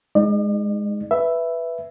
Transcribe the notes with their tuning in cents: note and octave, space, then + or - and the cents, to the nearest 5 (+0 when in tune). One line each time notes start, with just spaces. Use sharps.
G#3 +0 D#4 +0 D5 +45
B4 +0 E5 +5